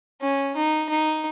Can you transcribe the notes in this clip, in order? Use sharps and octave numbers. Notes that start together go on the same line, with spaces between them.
C#4
D#4
D#4